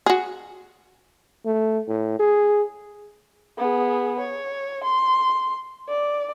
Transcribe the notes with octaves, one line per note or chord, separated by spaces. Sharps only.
F#4 G#4
A3
A2
G#4
B3 G#4
C#5
C6
D5